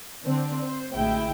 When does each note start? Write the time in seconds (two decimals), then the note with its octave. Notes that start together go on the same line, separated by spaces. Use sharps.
0.25 D3 C4 D4
0.62 C5
0.94 A1 D2 G#3 E4 G5